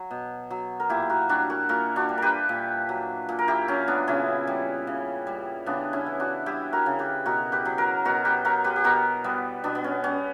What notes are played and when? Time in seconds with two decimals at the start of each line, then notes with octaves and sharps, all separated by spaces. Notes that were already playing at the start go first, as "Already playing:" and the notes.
Already playing: F#3 F#4
0.11 B2
0.51 F#3
0.80 A#4
0.89 A#2 E4 G4
1.09 F#4 A#4
1.29 G3 D4 F#4
1.50 F#4 A#4
1.69 A#2 F#4 A#4
1.96 D4 F#4
2.09 G3
2.18 G4 A#4 B4
2.49 A#2
2.89 F#3
3.29 A#2
3.39 A#4
3.48 E4 G4
3.68 F#3 C#4
3.88 B3 D4
4.07 C#3 C#4 E4
4.47 G3
4.87 C#3
5.27 G3
5.66 C#3 B3 D4
5.93 C#4 E4
6.06 E3
6.20 D4 F#4
6.46 G3 E4 G4
6.73 F#4 A#4
6.86 C#3
6.99 G4 B4
7.26 B2 F#4 A#4
7.52 G4 B4
7.65 F#3
7.78 F#4 A#4
8.05 B2 F#4 A#4
8.25 G4 B4
8.45 F#3 F#4 A#4
8.64 G4 B4
8.76 G4
8.84 B2 F#4 A#4
9.24 G3 B3
9.64 B2 B3 D4
9.75 B3
9.84 C#4
10.04 G3 C#4